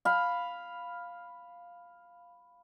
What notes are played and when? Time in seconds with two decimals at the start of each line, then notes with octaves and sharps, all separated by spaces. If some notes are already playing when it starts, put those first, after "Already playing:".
0.05 F5 B5